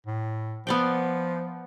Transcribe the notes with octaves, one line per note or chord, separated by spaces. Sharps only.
A2
F3 B3 D5 G5